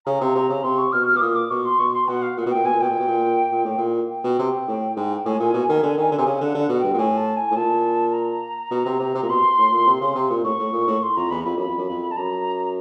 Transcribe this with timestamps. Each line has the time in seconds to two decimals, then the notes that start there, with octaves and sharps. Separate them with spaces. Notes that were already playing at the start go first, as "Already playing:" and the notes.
0.05 C#3 A#5
0.21 C3
0.35 C3
0.49 C#3
0.63 C3 C6
0.77 C#6
0.92 B2 F6
1.07 F6
1.15 B2 D6
1.21 A#2 D#6
1.35 D6
1.50 B2 C#6
1.65 C6
1.79 B2 C#6
1.93 C6
2.08 B2 F#5
2.22 F5
2.37 A#2 F#5
2.46 B2
2.51 A#2 G5
2.64 B2 G#5
2.73 A#2
2.80 B2 G5
2.90 A#2
2.99 B2
3.07 A#2
3.52 A#2
3.65 A2
3.77 A#2
4.09 G5
4.24 B2
4.39 C3
4.67 A2
4.96 G#2
5.25 A2 G#5
5.39 A#2
5.54 B2
5.69 D#3
5.83 D3
5.97 D#3
6.11 D3
6.18 C3
6.26 C#3
6.40 D3 F#5
6.54 D3
6.60 F#5
6.69 B2
6.79 G2 G5
6.94 A#2
6.98 A2 G#5
7.17 A5
7.36 G#5
7.51 A2
7.56 A#2 A5
8.13 A#5
8.71 B2
8.86 C3
8.99 C3
9.15 C3
9.23 A#2
9.29 B2 C6
9.58 A2
9.72 A#2
9.87 C3
10.01 C#3
10.15 C3
10.30 A#2
10.44 A2 C#6
10.59 A2
10.73 A#2
10.87 A2
11.02 C6
11.16 F2 A#5
11.30 E2 B5
11.44 F2 B5
11.56 F#2 B5
11.67 F2
11.78 F#2
11.89 F2
12.11 A5
12.17 F#2 A#5